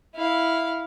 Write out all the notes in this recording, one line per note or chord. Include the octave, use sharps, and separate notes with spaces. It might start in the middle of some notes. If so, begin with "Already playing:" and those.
E4 F5